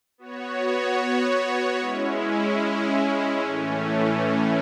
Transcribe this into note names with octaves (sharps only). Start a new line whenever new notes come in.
B3 F#4 C#5
G#3 C#4 E4
A2 E3 A3 C#4